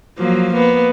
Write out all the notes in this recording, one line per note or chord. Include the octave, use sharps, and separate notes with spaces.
F3 F#3 A#3
A#3 B3